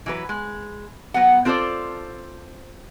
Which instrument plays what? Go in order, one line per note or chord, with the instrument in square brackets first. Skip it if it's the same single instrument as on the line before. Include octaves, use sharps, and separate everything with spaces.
[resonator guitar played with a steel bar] E3 F#3 B4
G#3
F#3 B3 F#5
C4 F4 A4 B4 C5 D5